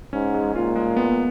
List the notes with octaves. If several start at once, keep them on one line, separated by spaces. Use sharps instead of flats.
G#2 C#4
G#3
A#2 F4
G#3
B3